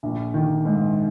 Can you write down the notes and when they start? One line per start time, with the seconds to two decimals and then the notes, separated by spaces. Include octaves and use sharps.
0.03 A#1
0.34 D#3
0.65 G#2